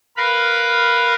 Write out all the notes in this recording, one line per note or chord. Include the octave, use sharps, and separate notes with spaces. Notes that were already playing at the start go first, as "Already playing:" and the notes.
A#4 B4 F5 B5